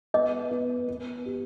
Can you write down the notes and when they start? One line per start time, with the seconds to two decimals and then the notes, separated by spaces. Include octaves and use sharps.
0.14 B3 D#5
0.51 B3
0.88 B3
1.26 G4